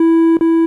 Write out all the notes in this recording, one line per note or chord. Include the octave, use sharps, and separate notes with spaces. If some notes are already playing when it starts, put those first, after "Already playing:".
Already playing: E4
E4